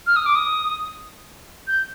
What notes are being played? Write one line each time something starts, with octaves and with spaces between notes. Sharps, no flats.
F6
D#6
D6
D#6
G6